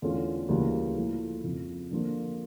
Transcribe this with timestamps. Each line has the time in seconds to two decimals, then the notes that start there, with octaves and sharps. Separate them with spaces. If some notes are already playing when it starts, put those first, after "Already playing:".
0.02 E2 D3 A3 C#4 F4
0.49 D2 C#3 E3 G3 A#3
0.97 A#2 F3 A3 E4
1.44 F2 C#3 F3
1.91 D3 F3 A#3 D4 F4